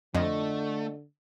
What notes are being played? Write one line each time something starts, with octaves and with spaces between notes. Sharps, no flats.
F2 D3 A3 F4 D#5